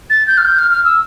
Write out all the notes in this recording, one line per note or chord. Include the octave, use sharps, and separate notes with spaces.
A6
G6
F6
G6
F6
F6
E6